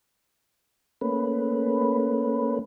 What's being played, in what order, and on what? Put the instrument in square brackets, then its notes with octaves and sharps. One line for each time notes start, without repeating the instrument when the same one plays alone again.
[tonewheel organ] A3 A#3 C#4 B4